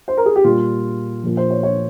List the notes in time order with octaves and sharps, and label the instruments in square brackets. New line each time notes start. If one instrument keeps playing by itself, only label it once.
[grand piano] C5
A#4
G#4
G4
A#2 G3 F4
A#2 F3
C5
C#5
C#5